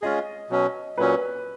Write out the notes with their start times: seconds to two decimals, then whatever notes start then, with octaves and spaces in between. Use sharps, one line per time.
0.02 G#3 C#4 F4 G#4 D#5
0.50 B2 F#3 C#4
0.98 A#2 F#3 C#4 B4